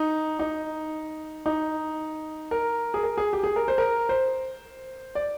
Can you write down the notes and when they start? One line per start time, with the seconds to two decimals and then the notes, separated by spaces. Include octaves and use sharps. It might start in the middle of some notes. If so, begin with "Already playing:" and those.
Already playing: D#4
0.39 D#4
1.46 D#4
2.51 A#4
2.94 G#4
3.03 A#4
3.18 G#4
3.33 G4
3.44 G#4
3.56 A#4
3.68 C5
3.78 A#4
4.09 C5
5.15 D5